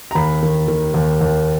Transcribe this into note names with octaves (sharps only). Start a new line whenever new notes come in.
A#5
D#2 B5
D#3
D#3
D#2
D#2